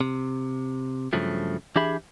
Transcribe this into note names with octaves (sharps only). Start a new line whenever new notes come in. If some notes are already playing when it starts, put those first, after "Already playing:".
C3
G2 C#3 F3 F#3 A3
E3 D4 G4 G#4 E5 B5